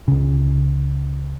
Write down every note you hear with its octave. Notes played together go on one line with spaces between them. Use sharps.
C#2 C#3